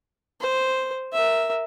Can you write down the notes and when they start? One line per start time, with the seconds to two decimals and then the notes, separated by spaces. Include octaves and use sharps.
0.41 C5
1.13 A#4 E5